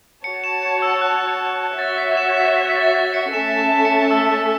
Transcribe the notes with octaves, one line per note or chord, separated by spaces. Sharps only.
F#4 C#5 A5 C#7
E7
C#7
E6
F#6
F#4 C#5 E5 A6
B6
E7
B6
B6
B6
A6
A6
C#7
A3 C#4 A4 E5 A5 E7
E7
C#7
E6